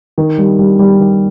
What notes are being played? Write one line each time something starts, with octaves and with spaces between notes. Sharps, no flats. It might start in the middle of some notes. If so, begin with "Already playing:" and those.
D#3
G3
G3
G3
D#3